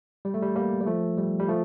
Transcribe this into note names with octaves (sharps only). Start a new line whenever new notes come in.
G3
A3
G3
G3 A#3
G3
F3 A3
G3
G3
F3 A3